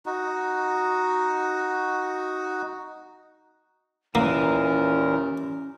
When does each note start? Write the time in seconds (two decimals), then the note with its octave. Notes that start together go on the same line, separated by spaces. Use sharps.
0.06 D#4 F#4
4.15 D#2 A#2 E3 A#3 C#4 A#4